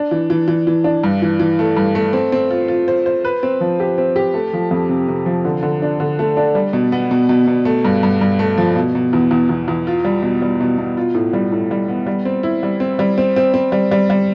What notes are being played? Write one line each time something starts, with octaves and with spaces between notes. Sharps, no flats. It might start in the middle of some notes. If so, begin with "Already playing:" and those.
Already playing: D4
E3
E3
E3
E3
D4
G2
E3
E3
A3
G2
A3
C4
C4
F4
F4
C5
C5
B4
C4
F3
G4
C4
G4
A3
F3
F2
C3
C3
F3
D3
D3
D4
D3
A3
D4
G3
B2
B3
B2
B2
B2
A3
G2
G2
G2
A3
F3
B2
B2
E2
E2
E2
E2
F4
G3
B2
G3
B2
B2
F4
A2
G3
A2
G3
B3
G3
C4
E4
G3
C4
G3
C4
C4
C4
G3
G3
G3